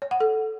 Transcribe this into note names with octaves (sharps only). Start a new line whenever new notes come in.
C#5
F#5
A4